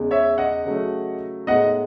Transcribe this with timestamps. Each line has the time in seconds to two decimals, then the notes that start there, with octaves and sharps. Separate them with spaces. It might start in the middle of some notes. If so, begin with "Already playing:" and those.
Already playing: E2 C#3 G#3
0.11 C#5 E5
0.38 D#5 F#5
0.65 C#3 F#3 A3
1.47 A2 G#3 B3 D#4 D#5 F#5